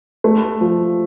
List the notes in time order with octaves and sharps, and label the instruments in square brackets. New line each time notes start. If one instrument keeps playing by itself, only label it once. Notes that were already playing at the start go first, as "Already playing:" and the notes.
[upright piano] A3
F3